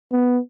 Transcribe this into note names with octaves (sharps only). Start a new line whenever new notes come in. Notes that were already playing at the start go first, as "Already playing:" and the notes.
B3